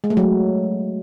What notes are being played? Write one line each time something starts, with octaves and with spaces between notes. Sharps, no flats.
G#3
A3
F#3